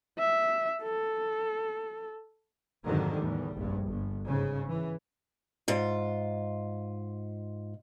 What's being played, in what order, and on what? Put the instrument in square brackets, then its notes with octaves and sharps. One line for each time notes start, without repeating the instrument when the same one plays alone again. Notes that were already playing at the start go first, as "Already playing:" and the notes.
[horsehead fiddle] E5
A4
[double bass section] F2 G#2 D3 D#3 F#3
E2 A2 G3
F1 A#1 G2
G1
G#2 C#3
E3
[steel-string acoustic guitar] G#2 F4